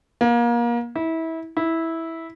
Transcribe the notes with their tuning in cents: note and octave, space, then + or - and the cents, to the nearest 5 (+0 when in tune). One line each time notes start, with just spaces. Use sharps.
A#3 +30
E4 -25
E4 -10